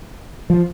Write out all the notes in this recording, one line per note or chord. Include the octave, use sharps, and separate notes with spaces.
F3